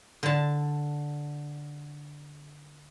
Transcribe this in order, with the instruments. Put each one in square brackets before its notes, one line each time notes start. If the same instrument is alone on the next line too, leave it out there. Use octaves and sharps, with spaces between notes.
[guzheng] D3 A5